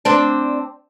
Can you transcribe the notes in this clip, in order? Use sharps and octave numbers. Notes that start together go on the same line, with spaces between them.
C4 D4